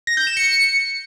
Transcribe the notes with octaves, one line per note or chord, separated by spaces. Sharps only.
A#6
G6
E7
C#7